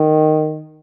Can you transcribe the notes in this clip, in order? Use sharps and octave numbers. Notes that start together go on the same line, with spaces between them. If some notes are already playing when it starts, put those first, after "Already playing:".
Already playing: D#3